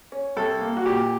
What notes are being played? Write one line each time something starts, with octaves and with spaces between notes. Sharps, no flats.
C#4
C2 A4
A#3
F#4
A#2 G4